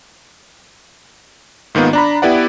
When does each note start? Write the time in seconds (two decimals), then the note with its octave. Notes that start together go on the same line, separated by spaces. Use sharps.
1.75 G#2 D#3 A#3 B3 F4
1.93 D4 A#5 B5
2.22 B3 E4 G4 B4 D5 F#5